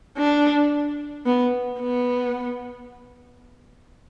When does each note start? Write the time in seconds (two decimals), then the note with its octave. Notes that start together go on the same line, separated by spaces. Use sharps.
0.17 D4
1.26 B3
1.79 B3